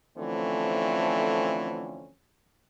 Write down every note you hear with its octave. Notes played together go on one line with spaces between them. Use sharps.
D3 E3 F3 A3 C4 C#4